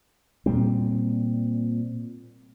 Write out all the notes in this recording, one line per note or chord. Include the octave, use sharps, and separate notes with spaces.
A#2 G3 C4